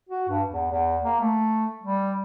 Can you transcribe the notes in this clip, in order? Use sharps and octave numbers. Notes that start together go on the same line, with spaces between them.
F#4
G2
E2
E2
A#3
A3
G3